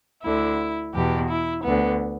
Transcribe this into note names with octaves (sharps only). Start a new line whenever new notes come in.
D2 D3 E4
E2 B2 G4
E4
D2 D3 B3